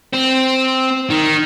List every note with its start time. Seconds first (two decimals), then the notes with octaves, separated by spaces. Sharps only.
0.13 C4
1.10 D#3